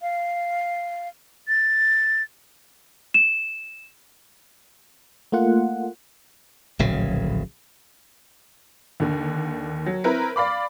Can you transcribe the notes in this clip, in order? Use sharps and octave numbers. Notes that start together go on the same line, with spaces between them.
F5
A6
E7
A3 A#3 F4 F#5
D1 A#1 C#3 F#3
D#2 D3
F#3
C4 E4 A#4 B4
D5 F5 B5 D6